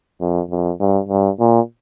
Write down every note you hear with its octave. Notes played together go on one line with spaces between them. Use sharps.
F2
F2
G2
G2
A#2